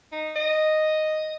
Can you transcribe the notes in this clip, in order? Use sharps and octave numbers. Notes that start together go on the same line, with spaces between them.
D#4
D#5